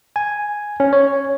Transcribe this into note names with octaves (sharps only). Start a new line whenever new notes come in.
G#5
C#4
C#5